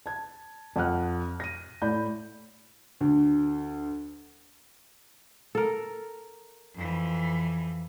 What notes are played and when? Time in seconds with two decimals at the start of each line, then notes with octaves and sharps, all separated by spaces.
0.06 A5 G#6
0.76 F2 F#5 F6 F#6
1.40 A#6 D#7
1.82 A2 D5 B5 G6
3.01 D2
5.55 A4 A#4
6.75 F2 E3